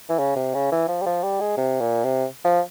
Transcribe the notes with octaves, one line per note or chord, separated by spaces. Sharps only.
E3
C#3
C3
C#3
E3
F3
G3
F3
G3
G#3
C3
A#2
C3
F3